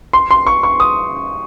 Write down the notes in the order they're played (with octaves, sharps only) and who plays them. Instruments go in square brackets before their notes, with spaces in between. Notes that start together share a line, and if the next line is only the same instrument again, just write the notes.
[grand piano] C6
C6
C#6
C#6
D#6